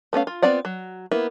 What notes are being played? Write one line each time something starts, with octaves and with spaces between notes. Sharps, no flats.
A3 B3 C#4 F5
F4
B3 C4 F4 D5 F#5
F#3
A#3 B3 E4